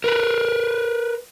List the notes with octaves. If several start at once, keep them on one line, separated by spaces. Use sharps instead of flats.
A#4 B4